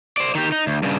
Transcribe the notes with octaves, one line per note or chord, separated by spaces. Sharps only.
C5 D5
D#3 G4
D#4
D2
G2 C#3